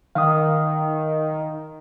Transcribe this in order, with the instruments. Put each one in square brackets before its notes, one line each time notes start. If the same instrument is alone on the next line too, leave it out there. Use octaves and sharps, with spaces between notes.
[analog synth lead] D#3 [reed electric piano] F5 D#6